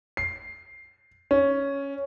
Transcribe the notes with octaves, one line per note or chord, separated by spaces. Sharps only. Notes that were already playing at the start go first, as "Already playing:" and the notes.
C7
C#4